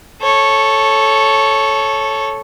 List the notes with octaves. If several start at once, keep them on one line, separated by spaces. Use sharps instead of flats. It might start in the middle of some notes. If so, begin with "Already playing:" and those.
A4 C#5